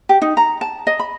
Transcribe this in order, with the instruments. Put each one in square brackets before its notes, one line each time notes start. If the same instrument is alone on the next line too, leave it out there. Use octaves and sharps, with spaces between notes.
[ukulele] G4
D#4
A#5
A5
D#5
B5